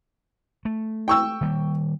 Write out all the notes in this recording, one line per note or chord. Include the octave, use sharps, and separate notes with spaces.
A3
G5 C#6 E6
D#3 G3 A#3